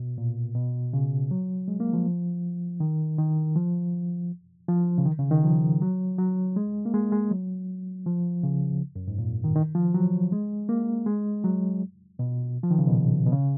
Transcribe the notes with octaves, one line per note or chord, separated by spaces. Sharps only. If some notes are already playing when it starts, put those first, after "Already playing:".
Already playing: B2
A#2
B2
C#3
F#3
G#3
A#3
F3
D#3
D#3
F3
F3
C#3
D#3
C#3
D#3
F3
F#3
F#3
G#3
A#3
G#3
G#3
F#3
F3
C#3
F#2
G#2
A#2
D#3
D#3
F3
F#3
G#3
A#3
G#3
F#3
B2
F3
D#3
C#3
B2
A#2
B2
C#3